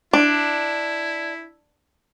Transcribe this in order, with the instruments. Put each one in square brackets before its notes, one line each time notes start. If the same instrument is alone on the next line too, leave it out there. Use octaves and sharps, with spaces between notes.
[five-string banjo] D4 [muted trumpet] E4